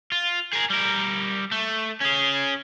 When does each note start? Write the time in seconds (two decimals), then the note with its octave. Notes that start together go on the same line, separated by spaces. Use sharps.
0.12 F4
0.53 G#4 A#4
0.70 G3 A#4
1.51 A3
2.01 C#4 G#4